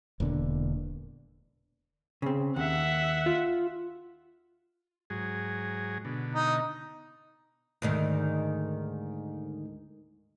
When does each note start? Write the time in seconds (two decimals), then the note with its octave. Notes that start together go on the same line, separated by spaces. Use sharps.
0.20 E1 A#2 D3
2.22 C#3 C4
2.56 D#2 E5 F#5
3.26 F4
5.10 G#2 F#3 G#4
6.05 B2 D3
6.34 D#4
7.82 D2 G#2 D#3